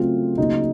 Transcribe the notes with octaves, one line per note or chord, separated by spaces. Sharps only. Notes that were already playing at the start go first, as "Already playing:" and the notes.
Already playing: C#3 F#3 A3 C4 F4
C#3 F#3 A#3 D#4